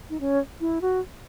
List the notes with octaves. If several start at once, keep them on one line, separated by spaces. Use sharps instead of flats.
D#4
C#4
E4
F#4